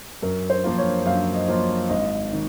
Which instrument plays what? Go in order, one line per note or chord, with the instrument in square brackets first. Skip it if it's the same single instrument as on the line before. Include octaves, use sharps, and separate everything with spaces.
[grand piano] F#2 [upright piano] A#4
[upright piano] C5
[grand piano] F3 A#3 F4
[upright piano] C#5
[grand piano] F#2 [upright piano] F5
[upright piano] D#5
[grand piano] F3 A#3 F4
[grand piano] G#1 [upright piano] D#5
[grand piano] D#3